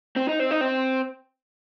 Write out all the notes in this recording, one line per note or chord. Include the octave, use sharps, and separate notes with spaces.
C4
D#4
C4
D#4
C4